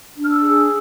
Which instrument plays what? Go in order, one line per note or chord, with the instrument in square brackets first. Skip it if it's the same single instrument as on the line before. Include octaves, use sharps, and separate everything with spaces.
[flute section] D4
F6
E6
G#4